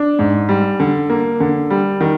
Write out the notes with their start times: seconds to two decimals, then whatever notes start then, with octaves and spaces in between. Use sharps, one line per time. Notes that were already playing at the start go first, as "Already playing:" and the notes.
Already playing: D4
0.19 G#2
0.49 G3
0.79 D3
1.10 A#3
1.40 D3
1.70 G3
2.01 D#3